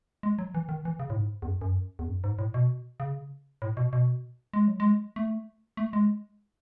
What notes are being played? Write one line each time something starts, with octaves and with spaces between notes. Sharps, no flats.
G#3
F#3
E3
D#3
E3
C#3
A2
G#2
E2
F#2
F#2
E2
F#2
G#2
A2
B2
C#3
A2
B2
B2
G#3
F#3
G#3
A3
A3
G#3